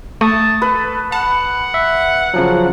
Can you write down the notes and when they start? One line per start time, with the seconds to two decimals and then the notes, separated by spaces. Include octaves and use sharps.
0.21 A3 A5 C#6 D#6
0.62 A4 B4
1.12 F#5 A5
1.74 E5
2.34 C#3 F3 F#3